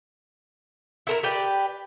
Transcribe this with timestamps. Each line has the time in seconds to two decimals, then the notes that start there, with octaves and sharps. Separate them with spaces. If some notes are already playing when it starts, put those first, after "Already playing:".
1.07 E4 A4 A#4
1.23 G4 B4 D5 G5